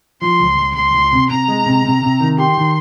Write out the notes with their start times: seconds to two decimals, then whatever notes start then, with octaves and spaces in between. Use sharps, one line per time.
0.22 F3 C6
0.40 C#2
0.58 C#2
0.75 C#2 C6
0.94 C#2
1.12 C3
1.30 C3 A#5
1.48 G#3
1.66 C3
1.85 C3
2.03 C3
2.20 D#3
2.38 G4 C6
2.57 D#3